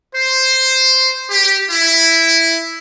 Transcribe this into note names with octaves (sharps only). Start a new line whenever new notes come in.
C5
G4
E4